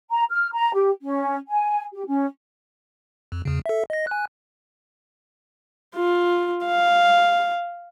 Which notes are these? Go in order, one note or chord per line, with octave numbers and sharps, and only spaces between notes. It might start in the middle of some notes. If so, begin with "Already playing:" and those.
A#5
F6
A#5
G4
C#4
G#5
G4
C#4
F2
E2 C#3
A4 E5
D#5 A#6
G#5 F#6
F4
F5